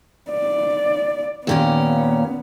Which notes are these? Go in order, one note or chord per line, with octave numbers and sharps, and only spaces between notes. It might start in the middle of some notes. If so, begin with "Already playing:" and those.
D5
D#2 A#2 B3 C#4